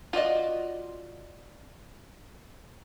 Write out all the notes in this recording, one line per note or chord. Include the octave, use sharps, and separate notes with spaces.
F4 F#4 D5 D#5